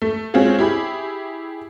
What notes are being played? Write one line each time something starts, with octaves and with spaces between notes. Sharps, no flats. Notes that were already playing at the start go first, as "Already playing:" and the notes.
A3
G#3 C4 C#4 F4 F#4 G#4
E4 G4 G#4 B5